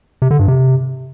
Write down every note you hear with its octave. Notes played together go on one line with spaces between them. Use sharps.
C3
D3
G2
C3